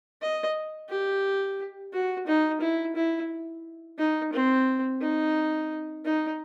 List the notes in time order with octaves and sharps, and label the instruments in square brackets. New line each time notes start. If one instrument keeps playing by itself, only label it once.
[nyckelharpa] D#5
G4
F#4
D#4
E4
E4
D#4
C4
D#4
D#4